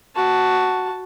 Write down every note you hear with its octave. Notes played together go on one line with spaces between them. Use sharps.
F#4 A5